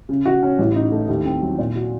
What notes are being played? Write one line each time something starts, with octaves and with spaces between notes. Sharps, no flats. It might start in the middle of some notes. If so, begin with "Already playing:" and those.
C#3
F#4
C#4
A1
D#4
A3
D#2
C4
F#3
A#2
F#4